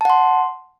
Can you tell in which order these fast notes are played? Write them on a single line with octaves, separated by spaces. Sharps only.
A5 F#5 C6